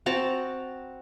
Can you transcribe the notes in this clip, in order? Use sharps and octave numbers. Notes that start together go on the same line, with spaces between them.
C4 F#4 A5 A#5